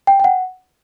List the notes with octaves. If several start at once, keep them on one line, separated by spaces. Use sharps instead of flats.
G5
G5
F#5